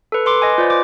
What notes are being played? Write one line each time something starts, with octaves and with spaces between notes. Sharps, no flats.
A4 B4
B4 C6 D6
D#5 G#5
F4 B4 C5 D5
D6